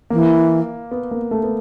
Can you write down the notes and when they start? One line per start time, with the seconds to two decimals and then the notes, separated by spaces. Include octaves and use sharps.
0.10 E3 A#3
0.91 B3
1.11 A#3
1.31 A3
1.43 B3